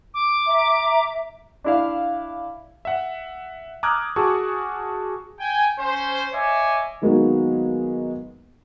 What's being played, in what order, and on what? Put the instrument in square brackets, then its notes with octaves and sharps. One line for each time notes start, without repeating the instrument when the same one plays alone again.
[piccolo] D6
[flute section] E5 A#5
[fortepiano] D4 E4 F5
[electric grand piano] E5 F#5
A#5 D6 D#6 F6 F#6 G#6
F#4 G#4 A5 C#6 E6
[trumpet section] G5 G#5
C#4 C5
C#5 D#5 E5 G#5 D6
[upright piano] D#3 F#3 G#3 A#3 B3 F#4